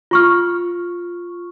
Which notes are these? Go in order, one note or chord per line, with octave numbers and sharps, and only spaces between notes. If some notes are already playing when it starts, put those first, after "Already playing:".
F4 C#6 F6